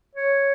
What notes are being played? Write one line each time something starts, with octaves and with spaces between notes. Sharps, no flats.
C#5